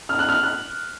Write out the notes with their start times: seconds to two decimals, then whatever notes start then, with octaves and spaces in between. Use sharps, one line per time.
0.09 F6
0.19 F#6
0.29 F6
0.43 F#6